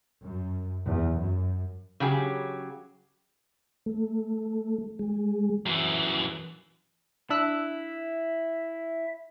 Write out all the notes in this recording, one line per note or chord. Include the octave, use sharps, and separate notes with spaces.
F#2
E2
F#2
C#3 F#3 G4 G#4
A3
G#3
F#2 E3
D4 E4 E5 E6 F#6